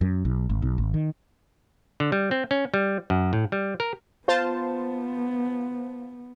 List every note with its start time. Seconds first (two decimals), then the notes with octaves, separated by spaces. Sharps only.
0.01 F#2
0.25 B1
0.50 G#1
0.62 B1
0.78 G#1
0.94 D#3
2.00 D3
2.12 G3
2.31 C4
2.51 C#4
2.74 G3
3.10 F#2
3.33 A2
3.52 G3
3.80 A#4
4.28 B3 F4 C5 A5